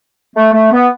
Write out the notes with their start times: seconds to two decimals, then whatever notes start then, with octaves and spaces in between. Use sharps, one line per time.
0.36 A3
0.53 A3
0.71 B3